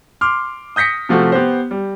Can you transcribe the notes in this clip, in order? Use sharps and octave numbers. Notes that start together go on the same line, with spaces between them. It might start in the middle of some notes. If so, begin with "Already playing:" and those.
C6 D6 F6
D#6 G6 A#6 B6 C#7
C3 F3 A3 F#4
B3 G4 C5
G3